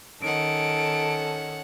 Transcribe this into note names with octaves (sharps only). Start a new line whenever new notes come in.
D#3 C#4 A4 F#5 D7